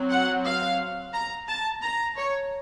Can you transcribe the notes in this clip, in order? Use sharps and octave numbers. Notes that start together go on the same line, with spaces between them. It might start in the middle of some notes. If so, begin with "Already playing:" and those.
Already playing: F#3 C4
F#5
F5
A#5
A5
A#5
C#5